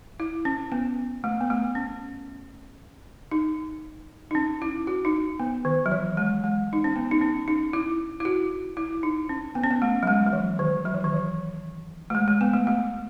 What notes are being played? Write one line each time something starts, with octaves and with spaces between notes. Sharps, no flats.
E4
C#4
B3
A3
B3
A3
C#4
D#4
D#4
C#4
E4
F#4
D#4
B3
D#3
F#3
E3
G#3
G#3
D#4
C#4
B3
D#4
C#4
D#4
E4
E4
F#4
E4
D#4
C#4
B3
C#4
B3
A3
F#3
G#3
F#3
E3
D#3
F#3
E3
D#3
E3
A3
G#3
G#3
B3
A3
A3